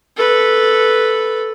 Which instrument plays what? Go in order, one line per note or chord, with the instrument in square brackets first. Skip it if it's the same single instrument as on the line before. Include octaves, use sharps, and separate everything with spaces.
[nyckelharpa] A4 B4